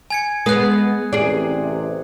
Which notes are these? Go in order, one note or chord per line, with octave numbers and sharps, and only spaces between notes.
G#5 G#6 C#7
G#3 B3 B4 D#6 F#6
A1 C3 G#4 D5